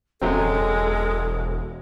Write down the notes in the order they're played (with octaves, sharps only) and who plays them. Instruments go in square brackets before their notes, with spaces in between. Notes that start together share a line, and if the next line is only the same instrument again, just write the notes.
[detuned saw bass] E1 [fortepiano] F#2 F#3 C4 [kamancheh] G#3 [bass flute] A4